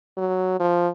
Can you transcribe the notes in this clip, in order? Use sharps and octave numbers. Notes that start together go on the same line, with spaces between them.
F#3
F3